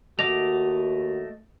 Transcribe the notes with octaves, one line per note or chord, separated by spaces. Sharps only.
D#2 A3 F#4 D#5 D6 F7